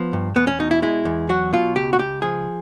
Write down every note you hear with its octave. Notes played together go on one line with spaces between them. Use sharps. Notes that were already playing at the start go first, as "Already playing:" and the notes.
Already playing: F3 B3
G2
E2 B3
C#4
B2 D#4
E4
G#3 E4
E2
F#3 F#4
B2 F4
C#2 G4
F#4
C#2 G4
F3 G#4